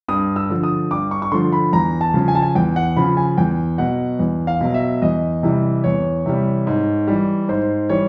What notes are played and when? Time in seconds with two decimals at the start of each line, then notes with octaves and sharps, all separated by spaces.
0.08 G2 D#6
0.36 E6
0.49 D3 F3
0.63 D#6
0.91 G2 D6
1.11 C#6
1.22 C#6
1.32 D3 F3 C6
1.52 B5
1.73 E2 A#5
2.01 A5
2.14 C#3 F3
2.28 G#5
2.35 A5
2.42 G#5
2.55 E2 G5
2.76 F#5
2.97 C#3 F3 B5
3.17 G#5
3.37 E2 G5
3.78 B2 F#3 F#5
4.19 E2
4.47 F5
4.61 B2 F#3
4.74 E5
5.02 E2 D#5
5.43 C3 E3 G3
5.84 E2 C#5
6.26 C3 E3 G3
6.67 G#2
7.07 E3 G3
7.49 G#2 C5
7.89 E3 G3 C#5